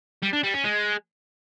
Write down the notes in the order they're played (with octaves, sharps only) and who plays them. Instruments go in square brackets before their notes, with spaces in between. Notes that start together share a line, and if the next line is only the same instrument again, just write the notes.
[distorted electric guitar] G3
D4
G3
C#4
G#3